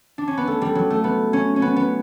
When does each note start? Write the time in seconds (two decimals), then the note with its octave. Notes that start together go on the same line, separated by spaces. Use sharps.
0.18 D4
0.28 C#4
0.37 B3
0.47 A3
0.61 G3
0.75 F#3
0.90 A3
1.04 B3
1.33 C#4
1.56 C#4
1.62 B3
1.76 B3